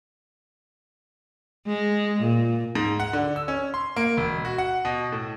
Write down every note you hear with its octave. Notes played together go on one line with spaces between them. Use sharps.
G#3
A#2
G#2
F#5
D3
E6
C#4
C6
A#3
E1
F#4
F#5
B2
A2